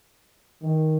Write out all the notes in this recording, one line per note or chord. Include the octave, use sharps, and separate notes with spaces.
D#3